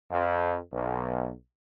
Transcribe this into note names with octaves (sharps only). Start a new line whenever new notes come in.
F2
B1